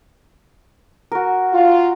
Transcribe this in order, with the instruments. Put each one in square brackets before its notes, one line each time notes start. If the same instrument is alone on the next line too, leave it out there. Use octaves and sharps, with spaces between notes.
[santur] F#4 A#4
[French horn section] F4